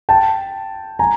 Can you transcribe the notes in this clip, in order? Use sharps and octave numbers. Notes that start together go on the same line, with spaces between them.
G5 A5
G#5 A#5